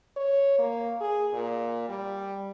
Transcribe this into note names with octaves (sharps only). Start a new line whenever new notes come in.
C#5
A#3
G#4
A#2
G3